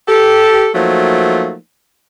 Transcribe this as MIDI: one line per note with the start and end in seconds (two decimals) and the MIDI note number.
0.08 0.68 67
0.08 0.68 69
0.73 1.55 53
0.73 1.55 54
0.73 1.55 57
0.73 1.55 58
0.73 1.55 63